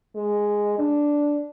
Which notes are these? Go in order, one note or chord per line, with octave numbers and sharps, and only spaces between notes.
G#3
D4